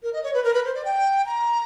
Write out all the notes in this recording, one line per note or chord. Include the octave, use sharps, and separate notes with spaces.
A#4
D#5
C#5
B4
A#4
B4
C5
D5
G5
A#5